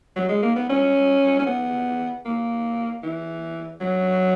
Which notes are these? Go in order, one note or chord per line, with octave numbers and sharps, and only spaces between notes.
F#3
G#3
A#3
B3
C#4
C#4
B3
A#3
E3
F#3